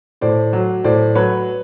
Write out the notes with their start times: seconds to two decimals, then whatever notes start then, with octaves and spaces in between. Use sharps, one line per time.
0.21 A2 C5 D5
0.53 F#3
0.84 A2 C5 D5
1.15 F#3 B4 C#5